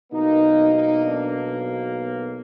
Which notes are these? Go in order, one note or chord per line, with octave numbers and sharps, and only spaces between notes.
B1 B2 A#3 D#4
D#4
D4